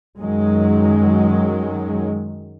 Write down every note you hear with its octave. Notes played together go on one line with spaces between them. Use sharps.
F#2 D#3 F#3 G#3